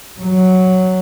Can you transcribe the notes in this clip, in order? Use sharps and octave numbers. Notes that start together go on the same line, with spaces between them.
F#3